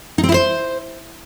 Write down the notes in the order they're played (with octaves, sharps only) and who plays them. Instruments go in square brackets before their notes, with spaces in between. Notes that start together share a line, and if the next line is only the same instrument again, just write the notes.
[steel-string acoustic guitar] D#4
C4
E4
C5